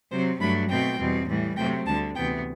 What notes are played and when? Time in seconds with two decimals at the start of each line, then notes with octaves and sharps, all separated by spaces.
0.11 C3 F#3 C4 C5
0.40 G2 F#3 A3 D4 B5
0.69 B2 A3 C4 G5
0.99 E2 B2 G3 C4
1.29 A2 E3 G3
1.56 C3 F#3 A3 C4 G5
1.86 D2 D3 G3 A5
2.15 D2 C3 E3 B3 G5